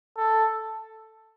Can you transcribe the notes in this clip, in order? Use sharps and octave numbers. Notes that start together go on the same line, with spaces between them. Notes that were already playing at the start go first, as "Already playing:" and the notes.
A4